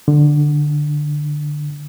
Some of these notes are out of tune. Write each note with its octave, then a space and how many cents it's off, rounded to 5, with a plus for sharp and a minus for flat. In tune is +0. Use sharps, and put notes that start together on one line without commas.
D3 +10